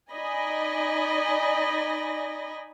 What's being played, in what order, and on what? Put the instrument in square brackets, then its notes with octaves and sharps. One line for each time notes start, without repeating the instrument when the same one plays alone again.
[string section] D#4 D5 D#5 G#5 B5 A#6